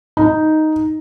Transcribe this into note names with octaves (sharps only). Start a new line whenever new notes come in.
D#4